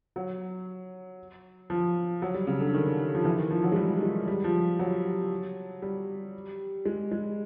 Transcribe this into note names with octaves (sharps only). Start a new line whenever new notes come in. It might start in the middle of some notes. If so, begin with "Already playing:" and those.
F#3
F3
F#3
G3
C#3
D3
D#3
F3
E3
D#3
F3
F#3
G#3
G3
G#3
G3
F3
F#3
G3
G#3
G#3